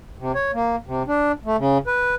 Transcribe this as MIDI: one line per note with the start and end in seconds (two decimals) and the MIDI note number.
0.19 0.32 48
0.35 0.51 73
0.54 0.76 58
0.86 1.03 48
1.07 1.32 62
1.46 1.57 57
1.58 1.78 49
1.87 2.15 71